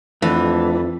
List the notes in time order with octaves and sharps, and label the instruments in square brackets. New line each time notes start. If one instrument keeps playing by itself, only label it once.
[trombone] F2 [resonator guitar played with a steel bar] E3 [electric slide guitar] A3 D4 F#4